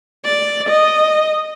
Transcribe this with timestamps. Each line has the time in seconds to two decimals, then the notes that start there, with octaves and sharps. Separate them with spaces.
0.25 D5
0.69 D#5